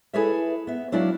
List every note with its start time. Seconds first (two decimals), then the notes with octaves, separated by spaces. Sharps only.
0.13 E4 G#4 A4 B4 C#5 E5
0.67 B3 E5
0.92 F#3 D4 E4 F#4 D5 F5